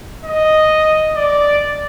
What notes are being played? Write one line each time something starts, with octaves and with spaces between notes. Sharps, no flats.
D#5
D5